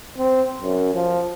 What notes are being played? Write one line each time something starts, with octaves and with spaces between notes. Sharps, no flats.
C4
F#2
F3